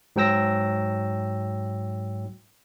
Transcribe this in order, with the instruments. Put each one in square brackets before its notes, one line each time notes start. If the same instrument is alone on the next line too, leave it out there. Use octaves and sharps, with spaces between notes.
[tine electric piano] G#2 F#3 G5 E6 A#6